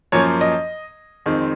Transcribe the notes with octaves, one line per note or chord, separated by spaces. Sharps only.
F#2 F3 A#3 C#4 C#5
D#5
F2 D#3 G#3 C4